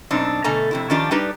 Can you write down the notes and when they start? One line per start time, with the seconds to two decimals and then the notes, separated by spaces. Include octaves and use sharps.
0.11 F#2 B2 C4 D4 D#4
0.44 B2 D3 A3 G#5 A#5
0.71 F2 C3 E4
0.90 D#3 F3 C#4 D4 F4 G4
1.11 G3 D4 D#4 G4 B4